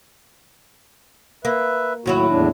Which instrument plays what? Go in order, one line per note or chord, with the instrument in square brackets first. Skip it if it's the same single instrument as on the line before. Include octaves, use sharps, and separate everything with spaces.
[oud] A#3 [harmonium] B4 E5
[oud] D#2 F#3 E4 [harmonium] A2 F#4
[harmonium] E2 A2 D4